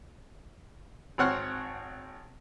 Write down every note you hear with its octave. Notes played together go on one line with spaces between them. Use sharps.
G#1 C4 C#5 F#5 F6 F#6